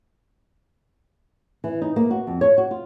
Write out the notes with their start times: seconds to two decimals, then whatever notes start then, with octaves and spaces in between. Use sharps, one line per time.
1.64 E3
1.82 D#4
1.96 A#3
2.11 F#4
2.27 F2
2.41 C#5
2.58 F#4
2.71 F4